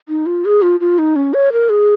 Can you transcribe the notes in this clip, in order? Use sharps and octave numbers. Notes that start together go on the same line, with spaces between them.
D#4
F4
G#4
F4
F4
D#4
C#4
C#5
A#4
G#4